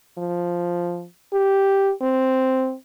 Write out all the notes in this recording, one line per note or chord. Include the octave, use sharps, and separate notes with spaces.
F3
G4
C4